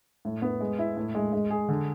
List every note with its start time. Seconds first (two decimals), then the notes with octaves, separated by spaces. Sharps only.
0.25 A2
0.42 B3
0.60 G#3
0.79 E4
0.97 A2
1.15 G#3
1.33 G#3
1.50 G#4
1.69 D3